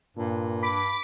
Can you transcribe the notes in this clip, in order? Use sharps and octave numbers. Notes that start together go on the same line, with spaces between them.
G2 A#2
B5 D6 B6